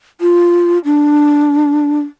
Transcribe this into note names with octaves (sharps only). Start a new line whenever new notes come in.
F4
D4